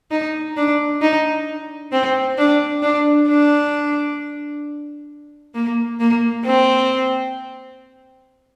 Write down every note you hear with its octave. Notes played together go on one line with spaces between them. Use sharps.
D#4
D4
D#4
C4
D4
D4
D4
A#3
A#3
C4